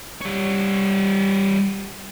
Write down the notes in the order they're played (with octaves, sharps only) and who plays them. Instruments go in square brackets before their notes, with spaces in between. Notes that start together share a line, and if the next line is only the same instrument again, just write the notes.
[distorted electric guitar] G3 C#5